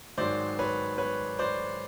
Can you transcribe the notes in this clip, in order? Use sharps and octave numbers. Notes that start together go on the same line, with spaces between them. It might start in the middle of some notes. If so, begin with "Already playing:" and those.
G#2 D#3 F#3 C5 D5
B4 C#5
B4 C#5
C5 D5